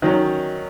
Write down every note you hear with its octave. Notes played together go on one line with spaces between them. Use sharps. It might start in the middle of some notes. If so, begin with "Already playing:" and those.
D#3 F#3 C#4